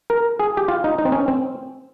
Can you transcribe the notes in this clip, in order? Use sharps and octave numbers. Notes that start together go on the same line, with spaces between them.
A#4
G#4
G4
F4
D#4
D#4
C4
C#4
C4